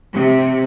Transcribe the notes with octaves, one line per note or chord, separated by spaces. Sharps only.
C3